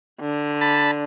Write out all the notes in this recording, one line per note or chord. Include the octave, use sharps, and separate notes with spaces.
D3
A5 B5